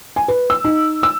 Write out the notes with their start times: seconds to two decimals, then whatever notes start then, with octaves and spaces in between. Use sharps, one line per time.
0.16 G#5
0.28 B4
0.50 E6
0.64 D#4
1.03 E6